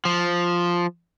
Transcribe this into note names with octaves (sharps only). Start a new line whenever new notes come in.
F3